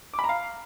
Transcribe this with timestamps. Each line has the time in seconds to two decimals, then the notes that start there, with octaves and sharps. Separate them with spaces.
0.14 D6
0.19 B5
0.24 A#5
0.29 F5